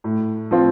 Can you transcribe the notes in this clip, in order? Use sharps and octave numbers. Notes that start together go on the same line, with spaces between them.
A2
F3 C4 F4